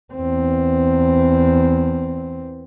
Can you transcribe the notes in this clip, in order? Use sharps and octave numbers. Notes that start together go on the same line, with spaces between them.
E2 C4